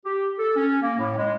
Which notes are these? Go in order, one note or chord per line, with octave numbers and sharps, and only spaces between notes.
G4
A4
C#4
A#3
A2
G#3